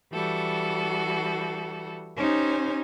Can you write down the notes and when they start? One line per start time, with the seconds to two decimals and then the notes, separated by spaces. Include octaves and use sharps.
0.12 E3 G3 F#4 A4
2.16 C#4 D#4 G4 C5 G#5